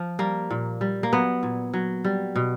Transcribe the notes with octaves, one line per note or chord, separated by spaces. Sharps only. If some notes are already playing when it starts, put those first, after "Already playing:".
Already playing: F3
G3 A#3
A#2
G3
A#3
F#3 B3
A#2
F#3
G3
B2